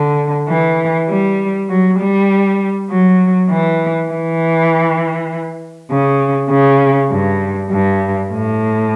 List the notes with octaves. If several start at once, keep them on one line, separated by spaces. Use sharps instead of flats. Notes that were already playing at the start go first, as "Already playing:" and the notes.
Already playing: D3
E3
G3
F#3
G3
F#3
E3
E3
C#3
C#3
G2
G2
A2